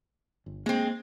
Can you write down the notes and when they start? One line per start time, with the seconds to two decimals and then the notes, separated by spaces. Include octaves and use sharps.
0.46 G1
0.66 G#3 A#3 C4